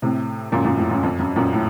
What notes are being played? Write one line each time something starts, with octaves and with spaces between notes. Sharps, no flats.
A2 C3
F#2 A#2
F#2 A#2
F2 A2
F#2
F2
F#2
F#2 A#2
A2